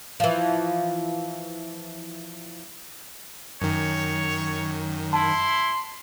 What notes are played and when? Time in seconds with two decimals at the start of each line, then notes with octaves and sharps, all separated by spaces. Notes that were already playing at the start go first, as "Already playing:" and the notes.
0.20 E3 F3
3.62 F#2 D#3 C#5
5.13 E4 A5 C6